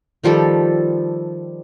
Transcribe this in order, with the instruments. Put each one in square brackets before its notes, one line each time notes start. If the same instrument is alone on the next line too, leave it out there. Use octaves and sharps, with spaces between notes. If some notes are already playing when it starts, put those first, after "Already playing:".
[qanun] D#3 F3 G3 A4